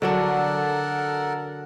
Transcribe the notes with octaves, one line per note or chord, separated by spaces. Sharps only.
D3 F#3 D4 A4 A#4 F#5